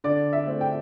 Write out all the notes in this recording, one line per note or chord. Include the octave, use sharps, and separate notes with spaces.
D3 D5
E5
A3 C4
G5